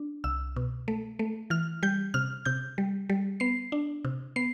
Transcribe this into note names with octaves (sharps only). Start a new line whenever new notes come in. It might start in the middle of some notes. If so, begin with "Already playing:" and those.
Already playing: D4
C2 E6
B2
A3
A3
E3 F6
G3 G6
C3 F6
C3 G6
G3
G3
B3 C7
D4
C3
B3 C7